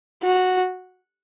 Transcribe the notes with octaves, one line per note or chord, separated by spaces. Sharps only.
F#4